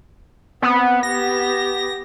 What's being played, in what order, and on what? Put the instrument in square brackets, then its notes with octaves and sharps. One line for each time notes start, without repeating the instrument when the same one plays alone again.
[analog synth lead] B3 [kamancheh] C4
[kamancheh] B3 G4 [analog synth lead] A#6